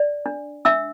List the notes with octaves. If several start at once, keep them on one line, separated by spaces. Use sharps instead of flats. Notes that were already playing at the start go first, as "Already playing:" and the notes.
Already playing: D5
D4
D4 E5 E6